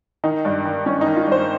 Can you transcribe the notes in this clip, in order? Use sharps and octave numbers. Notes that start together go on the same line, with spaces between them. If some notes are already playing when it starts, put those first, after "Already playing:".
D#3 D#4
G2
D#3
G2 C#4
D#4
D#3
F4
G2 C5